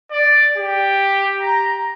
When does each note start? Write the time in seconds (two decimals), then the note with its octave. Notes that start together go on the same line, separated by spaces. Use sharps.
0.11 D5
0.57 G4
1.42 A#5